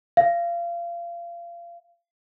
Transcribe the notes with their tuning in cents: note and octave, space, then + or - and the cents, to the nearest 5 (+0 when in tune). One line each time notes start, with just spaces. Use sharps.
F5 -30